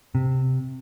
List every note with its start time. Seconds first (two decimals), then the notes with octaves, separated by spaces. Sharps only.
0.15 C3